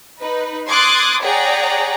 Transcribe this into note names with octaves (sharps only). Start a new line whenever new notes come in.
D#4 B4
C6 D6 D#6 F#6 G#6 A6
G#4 C#5 D5 F#5 G5 A#5